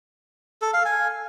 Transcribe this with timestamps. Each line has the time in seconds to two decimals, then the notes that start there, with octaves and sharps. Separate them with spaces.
0.62 A4
0.73 F5
0.85 G#5